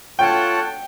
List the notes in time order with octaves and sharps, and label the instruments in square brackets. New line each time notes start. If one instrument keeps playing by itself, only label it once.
[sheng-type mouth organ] F4 A4 C#5 F#5 A5 [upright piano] G5